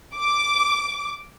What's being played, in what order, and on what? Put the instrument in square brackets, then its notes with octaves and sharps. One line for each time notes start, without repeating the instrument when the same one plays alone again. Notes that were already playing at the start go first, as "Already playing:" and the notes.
[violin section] D6